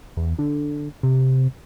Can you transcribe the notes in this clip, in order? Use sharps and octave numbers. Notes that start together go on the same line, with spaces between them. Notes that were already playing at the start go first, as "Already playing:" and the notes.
E2
D3
C3